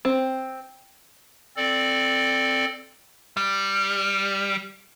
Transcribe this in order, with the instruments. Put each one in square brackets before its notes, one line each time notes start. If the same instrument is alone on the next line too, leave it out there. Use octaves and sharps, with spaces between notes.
[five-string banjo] C4
[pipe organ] C4 A4 D5
[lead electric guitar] G3